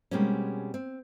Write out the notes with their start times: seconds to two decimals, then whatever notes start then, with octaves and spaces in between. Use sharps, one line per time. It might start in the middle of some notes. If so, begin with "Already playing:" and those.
0.11 B2 G3 G#3 A#3 C4 C#4
0.74 C4